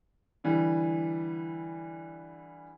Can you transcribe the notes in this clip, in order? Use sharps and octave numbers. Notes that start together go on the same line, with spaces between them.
D3 E3 G3